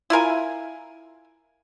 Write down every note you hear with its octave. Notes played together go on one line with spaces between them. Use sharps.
E4 F4 A#4 G#5